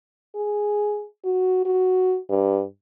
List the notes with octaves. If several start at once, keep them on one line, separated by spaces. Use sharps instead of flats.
G#4
F#4
F#4
G2